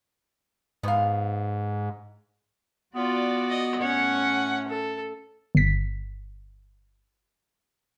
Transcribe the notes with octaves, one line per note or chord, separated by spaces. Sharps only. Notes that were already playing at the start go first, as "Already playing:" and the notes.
G#2 B3 F5
B3 F4 F#4 D5
D#5
A2 C#4 C#5 F#5
A4
G1 B6